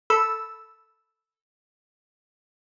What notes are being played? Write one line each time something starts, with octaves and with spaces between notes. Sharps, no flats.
A4 B5 E6